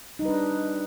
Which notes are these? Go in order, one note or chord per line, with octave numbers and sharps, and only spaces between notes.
G3 D4 D#4 B4